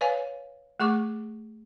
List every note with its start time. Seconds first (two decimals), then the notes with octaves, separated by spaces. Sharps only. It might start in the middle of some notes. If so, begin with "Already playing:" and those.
0.01 B4 C#5 D5 F5 G#5
0.80 A3 G#4 C#6 D6